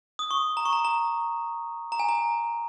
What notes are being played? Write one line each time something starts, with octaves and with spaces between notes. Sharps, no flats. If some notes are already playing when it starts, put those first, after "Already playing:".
D#6
C#6
A#5
C#6
A#5
A#5
A#5
G#5
A#5